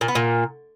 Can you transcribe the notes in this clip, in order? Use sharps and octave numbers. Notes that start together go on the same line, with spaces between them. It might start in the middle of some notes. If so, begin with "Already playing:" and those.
A#2
B3
A#2